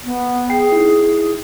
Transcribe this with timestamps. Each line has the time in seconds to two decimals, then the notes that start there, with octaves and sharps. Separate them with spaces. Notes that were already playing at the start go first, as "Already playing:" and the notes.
0.05 B3
0.50 G#4 G5 C7
0.72 D#4 E4